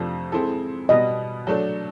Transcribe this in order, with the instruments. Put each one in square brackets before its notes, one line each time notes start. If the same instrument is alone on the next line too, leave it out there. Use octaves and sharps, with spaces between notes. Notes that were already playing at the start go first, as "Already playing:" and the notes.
Already playing: [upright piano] F2 C3 F3 A3 D4
G#3 C4 E4 A4
[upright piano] B2 G3 B3 [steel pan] D#5
[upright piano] F#3 A3 D4